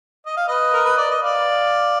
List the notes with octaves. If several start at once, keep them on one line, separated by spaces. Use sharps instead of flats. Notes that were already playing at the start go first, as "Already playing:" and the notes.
D#5
F5
B4 D#5
A#4
B4
D5
D#5
D5 F5